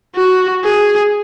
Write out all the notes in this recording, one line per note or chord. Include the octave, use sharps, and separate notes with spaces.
F#4
G#4